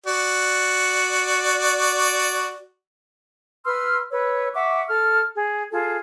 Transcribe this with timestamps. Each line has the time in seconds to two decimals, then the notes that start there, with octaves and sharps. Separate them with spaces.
0.06 F#4 D5
3.65 B4 C6 E6 F6
4.10 B4 C#5 E6
4.53 E5 F#5 C#6 D6
4.87 A4 F6
5.34 G#4
5.71 F4 G#4 A4